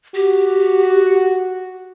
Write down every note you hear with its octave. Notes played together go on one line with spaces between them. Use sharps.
F#4 G4